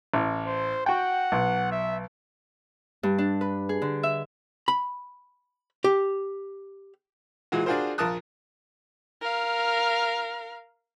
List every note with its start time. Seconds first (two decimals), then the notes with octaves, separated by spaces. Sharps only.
0.14 A1
0.47 C5
0.86 F#4 F#5 G5
1.32 B1
1.72 E5
3.03 G2
3.18 D4
3.41 B4
3.69 G#4
3.82 D3
4.03 E5
4.68 B5
5.84 G4
7.52 A#2 E3 G#3 F#4
7.66 D4 F4 F#4 G#4 A#4 C5
7.98 A#1 F4 A#4 A5 D#6 F#6
9.21 A#4 F5